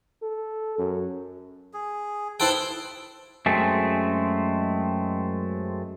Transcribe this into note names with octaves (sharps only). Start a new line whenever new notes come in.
A4
F#2
G#4
E4 A4 B4 C5 G5 A5
F#2 G#3 A3 C4